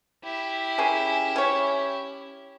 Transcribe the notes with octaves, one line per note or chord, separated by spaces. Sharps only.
E4 G4
C#4 G#4 A#4
C#4 C#5